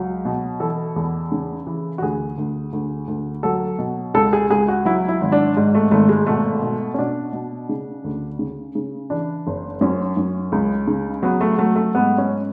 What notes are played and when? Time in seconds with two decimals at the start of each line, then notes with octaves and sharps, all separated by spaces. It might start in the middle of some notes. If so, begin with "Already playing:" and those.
Already playing: C#2 F#3
0.25 B2
0.60 E3 A4
0.96 E2
1.32 C#3
1.67 E3
1.98 F#4
2.02 D2 G#4
2.38 D2
2.73 D2
3.08 D2
3.43 F#3 A4
3.79 B2
4.14 C#2 A4
4.33 G#4
4.50 C#2 G#4
4.68 F#4
4.85 F#3 E4
5.08 E4
5.21 G#1
5.32 D4
5.57 G#2
5.75 A3
5.91 G#1 A3
6.09 G#3
6.27 B2 A3
6.62 B2
6.94 C#4
6.99 B2 D4
7.33 B2
7.69 C#3
8.04 D2
8.39 C#3
8.75 C#3
9.10 E3 D4
9.47 F#1
9.81 F#2 C#4
10.17 F#2
10.52 C#2
10.88 C#3
11.23 F#3 B3
11.41 A3
11.58 F#3 A3
11.76 A3
11.95 G#2 B3
12.18 C#4